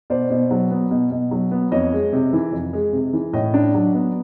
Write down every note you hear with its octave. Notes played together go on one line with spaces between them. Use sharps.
B2 C5 D5
B2
F#3
B3
B2
B2
F#3
B3
F2 C#5 D#5
G#3
C3
E3
F2
G#3
C3
E3
A2 C#5 D#5
D4
F#3
B3